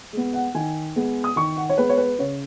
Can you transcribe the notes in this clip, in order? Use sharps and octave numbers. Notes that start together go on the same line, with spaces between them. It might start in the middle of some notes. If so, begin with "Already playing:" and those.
G#3 B3
F#5
D#3 G#5
G#3 B3
D#6
D#3 C#6
F#5
C#5
G#3 B3 B4
C#5
B4
C#3 C#5